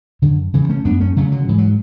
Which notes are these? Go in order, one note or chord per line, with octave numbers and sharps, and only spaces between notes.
F#2 D3
C#3 E3
A3 C#4
F#2 B3 D4
A3 C#4
C#3 F#3 A3
D3 F#3
G#2 E3
F#3